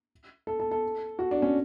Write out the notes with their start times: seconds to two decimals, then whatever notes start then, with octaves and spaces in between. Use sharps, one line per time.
0.47 A4
0.60 A4
0.71 A4
1.19 F#4
1.31 D4
1.42 C#4